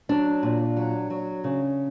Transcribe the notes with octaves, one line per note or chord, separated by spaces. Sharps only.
F#3 D4
A#2
F#3
F#3
C#3